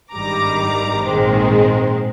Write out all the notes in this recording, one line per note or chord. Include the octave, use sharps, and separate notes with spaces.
G#1 G2 D#3 G3 A#5 D6
A#1 G#2 D#3 G#3 C4